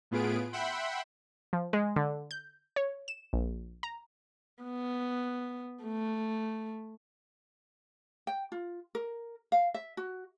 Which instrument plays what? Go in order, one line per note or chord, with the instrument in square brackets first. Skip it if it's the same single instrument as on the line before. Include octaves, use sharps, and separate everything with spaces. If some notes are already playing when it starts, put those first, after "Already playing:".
[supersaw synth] A2 B3 F4 G#4 B4 D7
E5 F#5 G5 B5 C6
[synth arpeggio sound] F3
G#3
D3
G6
C#5
E7
A#1
A#5
[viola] B3
A3
[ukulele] G5
F4
A#4
F5
E5
F#4